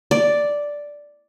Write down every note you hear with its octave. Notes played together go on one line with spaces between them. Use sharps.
D5